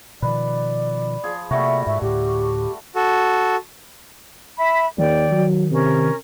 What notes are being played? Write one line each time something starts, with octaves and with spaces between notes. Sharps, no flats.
B2 D#3 F3 B4 D5
F3 G#4
C3 G3 A3 A#3 F#4 E5
G#2 E5
D2 A2 G4
F#4 A4
E5 B5
D#2 D#3 D5 G5
F#3
C3 C#4 A#4